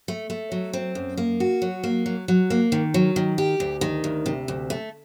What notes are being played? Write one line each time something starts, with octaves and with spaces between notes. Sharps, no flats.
A3
A3
F#3
C4
F#2
A#3
F#4
F#3
A#3
F#3
F#3
A#3
D#3
F#3
D#3
G4
D2
D#3
D2
C3
D2
A3